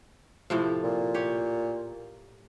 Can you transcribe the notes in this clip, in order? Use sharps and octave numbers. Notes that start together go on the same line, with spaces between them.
A2 C3 F3
A#2
G4 C#5